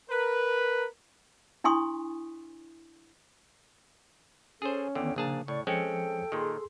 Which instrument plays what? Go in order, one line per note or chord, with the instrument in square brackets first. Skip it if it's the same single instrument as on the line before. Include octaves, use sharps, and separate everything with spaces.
[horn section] A#4 B4
[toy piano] D4 E4 G#5 C6 C#6 D#6
[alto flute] C#4 [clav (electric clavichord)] G#4 C5 [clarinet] A4
[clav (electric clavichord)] E2 D3 [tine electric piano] D#3 B3 [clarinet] G5
[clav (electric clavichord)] A#1 G#4 A5 [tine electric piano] C#3 [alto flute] A#3 [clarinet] D4
[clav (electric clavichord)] A2 [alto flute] D5 [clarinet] C#6
[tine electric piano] F3 C#7 [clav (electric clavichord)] G#3 C4 C#4 [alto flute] A4 [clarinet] G5
[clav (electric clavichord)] A#2 D#3 [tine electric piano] G#4 C6